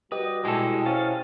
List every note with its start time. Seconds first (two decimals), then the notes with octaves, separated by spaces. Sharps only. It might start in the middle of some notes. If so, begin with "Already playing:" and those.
0.12 G3 F#4 G4 B4 D#5
0.45 G#3 E4 A4 G5
0.86 C#4 C5 C#5 F5 A6